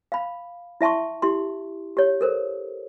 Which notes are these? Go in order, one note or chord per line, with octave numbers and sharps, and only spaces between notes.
F5 B5
E4 E5 A5 C6 C#6
E4 G4 C6
G4 C#5
A4 A#4 C5